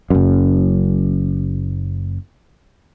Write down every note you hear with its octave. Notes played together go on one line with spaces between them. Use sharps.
F#1 F#2